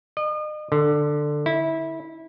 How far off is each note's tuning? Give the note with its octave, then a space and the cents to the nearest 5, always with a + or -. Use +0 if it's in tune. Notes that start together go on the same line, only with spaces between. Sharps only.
D#5 -40
D3 +10
E4 -20